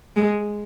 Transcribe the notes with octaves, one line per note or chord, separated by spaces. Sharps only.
G#3